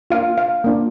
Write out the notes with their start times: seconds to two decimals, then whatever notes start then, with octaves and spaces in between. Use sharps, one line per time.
0.10 A#3 D4 F4 F5
0.38 F5
0.64 A#3 D4 F4